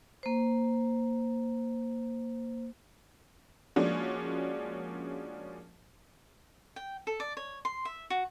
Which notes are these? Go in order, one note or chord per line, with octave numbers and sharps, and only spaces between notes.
A#3 C5
F3 G#3 A#3 C#4 D4 F#4
G5
A4
D5
C#5
C6
E5
F#4